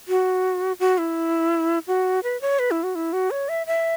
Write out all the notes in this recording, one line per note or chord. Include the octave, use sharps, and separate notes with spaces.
F#4
F#4
E4
F#4
B4
C#5
B4
E4
F#4
E4
F#4
C#5
E5
E5